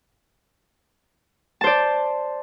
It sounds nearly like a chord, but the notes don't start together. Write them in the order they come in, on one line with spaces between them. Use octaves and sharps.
A5 C5 D5